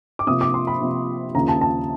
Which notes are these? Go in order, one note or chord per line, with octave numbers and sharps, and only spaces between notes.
D6
C3 F3 A#3 D#6
D6
C6
B5
C3 F3 A#3
D#2 C#3 F3 A#3 C#4 A#5
A5
A5